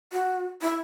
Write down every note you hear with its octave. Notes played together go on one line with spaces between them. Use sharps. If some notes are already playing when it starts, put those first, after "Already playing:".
F#4
E4